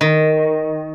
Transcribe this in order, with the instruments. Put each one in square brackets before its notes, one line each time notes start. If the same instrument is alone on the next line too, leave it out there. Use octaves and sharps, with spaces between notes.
[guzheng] D#3